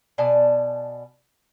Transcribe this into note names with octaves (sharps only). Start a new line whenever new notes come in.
B2 D5 G#5 A5